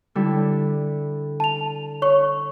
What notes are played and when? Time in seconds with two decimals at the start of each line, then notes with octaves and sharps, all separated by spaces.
0.15 D3 G3 E4
1.40 A5 F7
2.02 C#5 C#6